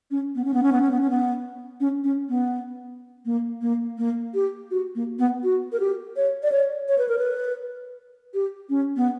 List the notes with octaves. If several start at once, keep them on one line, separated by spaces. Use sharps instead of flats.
C#4
B3
C#4
B3
C#4
B3
C#4
B3
C#4
B3
C#4
C#4
B3
A#3
A#3
A#3
G4
F#4
A#3
B3
F#4
A#4
G4
C#5
D5
C#5
C#5
B4
A#4
B4
G4
C#4
B3